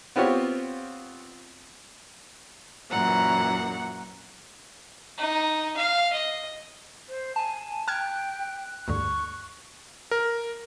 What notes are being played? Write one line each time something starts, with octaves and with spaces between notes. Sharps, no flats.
B3 C4 F4 G4 C#5
F#2 A#2 E3 F#5 A#5
D#4
F5
D#5
C5
G#5 A5
G5 A5 F6 F#6 G#6
D2 G2 D3 C#6
A#4